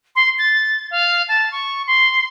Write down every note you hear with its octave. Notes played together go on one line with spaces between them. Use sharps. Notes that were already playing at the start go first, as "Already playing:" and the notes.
C6
A6
F5
A5
C#6
C6